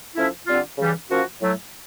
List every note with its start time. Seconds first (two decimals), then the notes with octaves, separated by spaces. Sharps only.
0.15 F3 A3 C#4 E4
0.47 D3 G3 C4 F4
0.78 C#3 E3 G3
1.10 F3 A#3 C#4 F#4
1.41 A2 F#3 A3